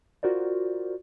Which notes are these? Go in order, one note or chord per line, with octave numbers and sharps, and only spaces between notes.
F4 F#4 A#4 C5 D5